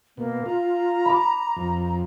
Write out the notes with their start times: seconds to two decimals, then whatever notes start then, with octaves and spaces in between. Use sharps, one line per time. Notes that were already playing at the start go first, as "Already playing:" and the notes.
0.17 B2 A#3
0.46 F4 A#5
1.05 B5 D6
1.56 F2